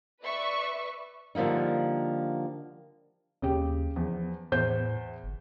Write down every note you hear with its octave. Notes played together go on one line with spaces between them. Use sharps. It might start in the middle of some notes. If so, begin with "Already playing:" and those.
B4 D5 E5 C#6
D3 F3 G3 A#3 D#4
D#2 C#3 G4
E2 F3
E2 A2 C5 G6
G1